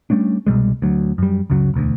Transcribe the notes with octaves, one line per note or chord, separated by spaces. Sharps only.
G3 A3 C#4 D4
C2 B2 G3 G#3
D2 F#3
F#2 G3
C#2 F#2 C#3 F#3
E1 D2